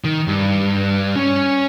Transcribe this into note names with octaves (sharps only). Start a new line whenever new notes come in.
D#3
G2
C#4 C#5